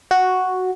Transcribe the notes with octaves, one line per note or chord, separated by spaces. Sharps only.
F#4